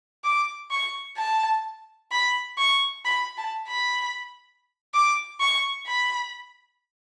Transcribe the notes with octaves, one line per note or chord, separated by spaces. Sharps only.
D6
C#6
A5
B5
C#6
B5
A5
B5
D6
C#6
B5